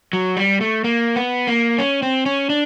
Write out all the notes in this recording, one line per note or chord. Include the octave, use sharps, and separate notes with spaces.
F#3
G3
A3
A#3
B3
A#3
C#4
C4
C#4
D4